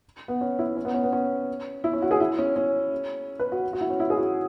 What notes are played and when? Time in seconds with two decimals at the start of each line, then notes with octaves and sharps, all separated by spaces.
0.28 B3
0.41 C#4
0.59 E4
0.77 C#4
0.85 B3
0.94 C#4
1.04 B3
1.13 C#4
1.84 E4
1.93 C#4
2.02 F#4
2.11 G#4
2.20 E4
2.39 C#4
2.56 C#4
3.39 B4
3.52 F#4
3.73 F#4
3.81 E4
3.90 C#4
4.00 E4
4.10 G#4
4.17 F#4